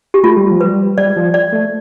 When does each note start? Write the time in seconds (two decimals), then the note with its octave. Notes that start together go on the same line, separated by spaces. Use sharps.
0.14 G4
0.23 A3 F4
0.37 G3
0.51 F3
0.61 G3 B4
0.98 G3 D5
1.16 F3
1.34 D5
1.52 A3